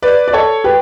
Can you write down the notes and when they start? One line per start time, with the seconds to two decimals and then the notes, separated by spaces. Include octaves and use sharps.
0.02 B4 D5
0.28 D5
0.33 A4 C#5
0.64 G4 B4